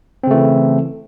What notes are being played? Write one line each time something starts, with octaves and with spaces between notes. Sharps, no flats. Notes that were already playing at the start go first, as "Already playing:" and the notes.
C#3 E3 A3 C4